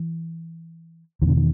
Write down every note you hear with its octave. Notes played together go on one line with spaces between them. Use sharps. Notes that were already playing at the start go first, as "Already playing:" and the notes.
Already playing: E3
E2 B2 D3 D#3
D#3